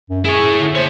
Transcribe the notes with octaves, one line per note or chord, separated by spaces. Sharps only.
F#2
E4 G#4 C#5
D3
C5 C#5 A5